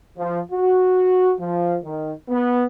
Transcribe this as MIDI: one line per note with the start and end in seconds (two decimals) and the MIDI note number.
0.17 0.40 53
0.52 1.33 66
1.39 1.77 53
1.84 2.13 51
2.29 2.64 59